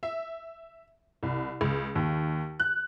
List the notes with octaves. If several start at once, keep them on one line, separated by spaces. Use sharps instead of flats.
E5
C2
C#2
D#2
F#6